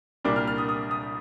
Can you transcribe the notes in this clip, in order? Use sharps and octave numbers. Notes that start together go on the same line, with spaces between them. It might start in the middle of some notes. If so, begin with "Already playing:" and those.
C2 A#2 G3 A#3 D4 D6
F6
F6
D#6
D#6
D#6